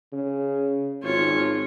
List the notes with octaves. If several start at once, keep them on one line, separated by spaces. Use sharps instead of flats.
C#3
G#1 F4 C#5